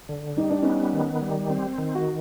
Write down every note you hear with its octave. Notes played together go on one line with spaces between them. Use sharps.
D3
G3 D#4
D4
B3 C#4 D#4
D#3
G3
C4
D#3
F#4